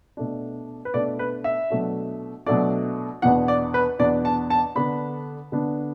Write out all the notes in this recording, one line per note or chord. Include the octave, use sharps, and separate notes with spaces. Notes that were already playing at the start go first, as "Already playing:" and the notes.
B2 A3 D4
B4
B2 A3 D4 D5
B4
E5
B2 F#3 A3 D4
B2 F#3 A3 D4 D5
E2 B2 B3 D4 F#5
D5
B4
E2 B2 B3 D4 D5
A5
A5
D3 B3 D4 B5
D3 B3 D4